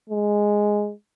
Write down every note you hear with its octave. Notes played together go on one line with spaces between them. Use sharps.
G#3